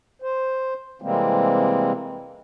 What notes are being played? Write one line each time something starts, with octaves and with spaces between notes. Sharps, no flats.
C5
C3 E3 G3 G#3 A#3 C4